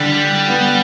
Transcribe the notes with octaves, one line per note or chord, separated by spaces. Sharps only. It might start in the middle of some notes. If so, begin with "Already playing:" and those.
Already playing: D3 G3 D4
B3 B4